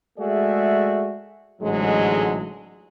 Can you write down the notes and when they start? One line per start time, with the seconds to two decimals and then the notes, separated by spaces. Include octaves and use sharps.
0.19 G#3 A3 F#4 G#4 D5 E5
1.62 A1 G#2 D3 F#3 G#3